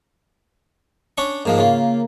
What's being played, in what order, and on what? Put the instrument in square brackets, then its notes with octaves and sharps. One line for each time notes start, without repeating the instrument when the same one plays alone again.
[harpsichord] C#4 D4 C#6
[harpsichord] G#2 F3 G#3 [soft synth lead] A#3
[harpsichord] C#3 F4